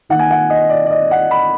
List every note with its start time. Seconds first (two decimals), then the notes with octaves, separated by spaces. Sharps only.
0.09 D#3 A#3 D#4 F#5
0.19 G#5
0.31 F#5
0.50 D#5
0.70 D5
0.86 D5
0.91 D#5
1.11 F#5
1.31 B5